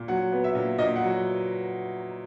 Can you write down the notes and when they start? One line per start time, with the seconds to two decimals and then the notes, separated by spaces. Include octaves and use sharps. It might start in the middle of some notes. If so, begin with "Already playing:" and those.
Already playing: A#2
0.08 F#3 F#5
0.32 B3
0.44 E5
0.55 A#2
0.78 A#2 D#5
0.96 F#5
1.01 F#3